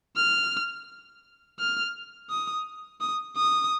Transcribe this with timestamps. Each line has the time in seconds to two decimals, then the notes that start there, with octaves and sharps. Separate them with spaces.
0.17 F6
1.59 F6
2.30 D#6
3.01 D#6
3.37 D#6